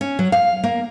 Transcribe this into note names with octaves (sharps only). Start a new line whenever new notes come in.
C#4
F#3
F5
A#3